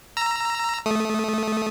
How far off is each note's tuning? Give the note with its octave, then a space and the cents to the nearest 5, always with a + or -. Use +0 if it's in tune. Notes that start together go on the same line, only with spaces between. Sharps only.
A#5 +0 E6 +25
A3 -15 D#6 +0